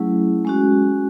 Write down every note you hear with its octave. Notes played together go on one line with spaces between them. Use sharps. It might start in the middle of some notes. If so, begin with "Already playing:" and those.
Already playing: F#3 A3 C#4 E4 G#4
G#3 C#4 F#4